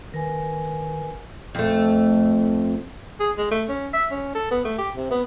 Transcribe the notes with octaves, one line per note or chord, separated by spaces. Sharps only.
D#3 A#4 B4 G#5
F2 A3
G#4
G#3
A3
C#4
E5
C#4
A4
B3
A3
G4
C3
B3